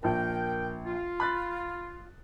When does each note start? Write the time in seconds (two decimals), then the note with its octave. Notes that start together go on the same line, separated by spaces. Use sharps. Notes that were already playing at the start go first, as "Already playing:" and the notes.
0.03 A#1 A#4 G5 A5
0.85 F4
1.20 B5 F#6 A6